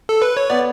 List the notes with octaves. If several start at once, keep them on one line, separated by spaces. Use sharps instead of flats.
A4
B4
C#5
B3 D5